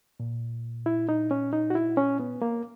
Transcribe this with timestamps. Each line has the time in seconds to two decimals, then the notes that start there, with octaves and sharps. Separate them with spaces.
0.20 A#2
0.86 E4
1.09 D#4
1.31 C#4
1.53 D#4
1.70 F#4
1.75 E4
1.97 C#4
2.20 B3
2.42 A#3